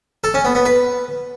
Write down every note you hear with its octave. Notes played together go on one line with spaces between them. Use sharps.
A4
C#4
B3
B3
B4